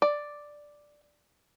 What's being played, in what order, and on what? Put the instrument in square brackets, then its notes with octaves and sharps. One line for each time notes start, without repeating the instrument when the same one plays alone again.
[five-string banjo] D5